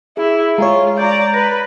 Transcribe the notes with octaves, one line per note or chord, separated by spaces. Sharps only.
E4 G#4
G#3 F4 G#4 C#5 A#5
D5 A#5 G6
B4 A6 A#6